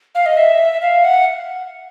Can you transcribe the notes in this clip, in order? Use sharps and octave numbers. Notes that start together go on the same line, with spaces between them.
F5
D#5
E5
F5
F#5